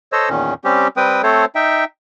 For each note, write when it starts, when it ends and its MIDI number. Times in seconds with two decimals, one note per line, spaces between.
0.12 0.29 69
0.12 0.29 72
0.12 0.29 73
0.12 0.29 75
0.12 0.29 88
0.29 0.54 40
0.29 0.54 46
0.29 0.54 51
0.29 0.54 61
0.64 0.88 55
0.64 0.88 60
0.64 0.88 61
0.64 0.88 67
0.97 1.22 55
0.97 1.22 60
0.97 1.22 71
0.97 1.22 79
0.97 1.22 87
1.23 1.45 57
1.23 1.45 60
1.23 1.45 69
1.23 1.45 72
1.23 1.45 73
1.55 1.84 63
1.55 1.84 76
1.55 1.84 79